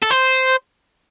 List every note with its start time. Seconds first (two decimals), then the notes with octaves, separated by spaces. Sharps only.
0.03 A4
0.11 C5